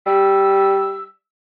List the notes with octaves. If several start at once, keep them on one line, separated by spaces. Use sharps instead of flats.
G3 E6